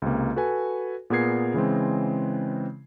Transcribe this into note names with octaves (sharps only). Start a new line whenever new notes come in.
C#2 C3 A#3
F#4 A4 B4 G#5
A#2 B3 G#4 A#4 G#6 C7
C#3 E3 G#3 C4